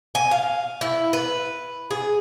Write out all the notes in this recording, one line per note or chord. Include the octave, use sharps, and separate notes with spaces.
G#5
F5
E4
B4
G#4